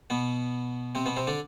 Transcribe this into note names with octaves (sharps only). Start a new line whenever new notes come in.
B2 B3
C3 C4
B2 B3
C3 C4
D3 D4